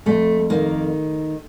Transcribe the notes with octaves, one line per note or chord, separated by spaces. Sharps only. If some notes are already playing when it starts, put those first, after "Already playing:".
F2 A3
D#3 A#3